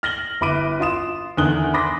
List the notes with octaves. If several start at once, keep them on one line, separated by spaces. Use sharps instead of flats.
F6 A#6 F#7 G7
G1 E4 B5 D6 D7 D#7
F4 C6 D#6 E7
E2 D3 D#3 D#6 F#6 G7
B5 C6 D6 D#6 A#6 B6